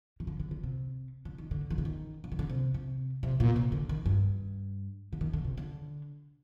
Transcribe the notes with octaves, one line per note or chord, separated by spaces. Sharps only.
D#3
D3
D3
D3
C3
D3
D#3
D3
D#3
D3
D#3
D3
D#3
D3
C3
C3
C3
A#2
C3
D3
D#3
G2
D3
D#3
D3
C3
D3